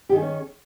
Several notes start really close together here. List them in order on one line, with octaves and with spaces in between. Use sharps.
G4 D#3 G#4 D#4 C#4